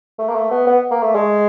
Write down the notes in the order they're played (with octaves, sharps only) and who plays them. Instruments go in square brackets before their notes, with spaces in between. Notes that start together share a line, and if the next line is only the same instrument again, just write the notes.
[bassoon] A3
A#3
A3
B3
B3
A#3
A3
G#3